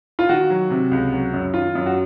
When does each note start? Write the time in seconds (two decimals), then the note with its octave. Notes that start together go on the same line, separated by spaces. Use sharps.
0.19 F4
0.29 D#3 F#4
0.50 F#3
0.70 C3
0.91 C#2
1.12 F#3
1.33 F#2
1.54 D#3 F4
1.75 F#2
1.86 F#4